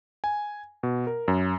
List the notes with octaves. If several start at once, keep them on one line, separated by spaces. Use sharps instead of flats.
G#5
B2
A#4
F#2